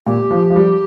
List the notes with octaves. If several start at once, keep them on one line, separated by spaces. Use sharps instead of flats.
A#2 G4
F3
F3
G3